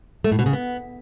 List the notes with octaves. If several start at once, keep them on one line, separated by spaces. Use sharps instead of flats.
A3
A2
B2
C#3
B3